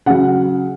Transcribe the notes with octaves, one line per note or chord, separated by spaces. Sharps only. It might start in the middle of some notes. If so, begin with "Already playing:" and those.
C#3 F#3 F#5